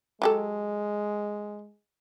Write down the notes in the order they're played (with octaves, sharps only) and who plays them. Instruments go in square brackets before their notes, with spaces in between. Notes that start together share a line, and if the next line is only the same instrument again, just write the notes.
[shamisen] F#3 G4 A4 [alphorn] G#3